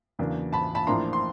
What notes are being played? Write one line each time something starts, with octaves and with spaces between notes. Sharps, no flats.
E2 C#3 F#3 A#3 D4
A5 B5
A5 B5
A1 A2 F3 A#3 D4 A#5 C6
C6